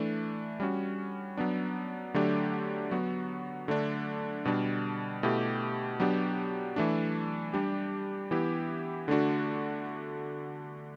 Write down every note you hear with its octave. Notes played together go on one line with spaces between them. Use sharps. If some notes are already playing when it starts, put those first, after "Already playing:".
Already playing: E3 A3 D4
G3 C#4 F#4
F#3 B3 D4
D3 F#3 A3 D4 G4
F#3 B3 F#4
D3 A3 D4
B2 G3 D4
B2 A3 E4 G4
F#3 B3 D4 G4
E3 A3 D4
G3 D4 G4
E3 B3 E4 G4
D3 A3 D4 F#4